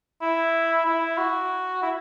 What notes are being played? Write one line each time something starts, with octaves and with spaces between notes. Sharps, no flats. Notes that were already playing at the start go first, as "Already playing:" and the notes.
E4
E4
F#4
E4